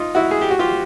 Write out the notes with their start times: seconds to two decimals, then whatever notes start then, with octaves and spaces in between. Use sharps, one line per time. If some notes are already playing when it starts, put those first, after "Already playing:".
Already playing: D#4 F4
0.15 E4 F#4
0.31 G#4
0.41 G4
0.51 F#4
0.59 F4 G4